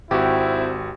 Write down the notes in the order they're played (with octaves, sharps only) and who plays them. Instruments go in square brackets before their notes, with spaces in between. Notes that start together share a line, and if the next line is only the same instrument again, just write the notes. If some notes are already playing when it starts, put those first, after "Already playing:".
[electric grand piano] G#1 F#4 [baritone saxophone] C4 [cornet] E4 [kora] G4